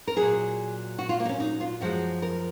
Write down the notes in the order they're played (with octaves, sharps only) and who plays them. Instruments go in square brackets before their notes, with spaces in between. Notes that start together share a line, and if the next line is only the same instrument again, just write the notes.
[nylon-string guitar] A#4
A#2 F#3 G#4
F#4
F4
A#3
D#4
C#4
D#4
F4
F#2 F3 G#3 F#4
A#4